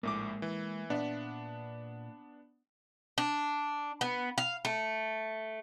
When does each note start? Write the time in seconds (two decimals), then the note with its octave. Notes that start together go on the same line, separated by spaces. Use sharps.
0.03 A#1 A2 G#3 A#3 D6
0.42 E3
0.90 A#2 B3 D4 E5 F#5
3.18 D4
4.01 B3
4.38 F5
4.65 A3